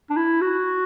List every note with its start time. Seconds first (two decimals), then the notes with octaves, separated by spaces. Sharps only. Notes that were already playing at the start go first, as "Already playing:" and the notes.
0.10 D4
0.17 E4
0.41 F#4